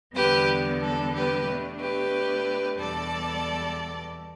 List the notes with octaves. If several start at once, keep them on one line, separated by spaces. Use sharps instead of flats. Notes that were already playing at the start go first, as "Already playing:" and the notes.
E2 D3 G3 B3 G4 B4
A4
G4 B4
B2 A3 D4
G4 B4
E2 B2 G3 A4 D5